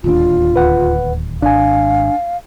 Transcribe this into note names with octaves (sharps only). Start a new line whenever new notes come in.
D1 D#2 D4 F4
D2 B4 F#5
G#1 D4 F5 G#5